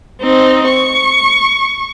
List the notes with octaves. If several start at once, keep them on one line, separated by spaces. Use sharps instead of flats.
C4 D#4
C#6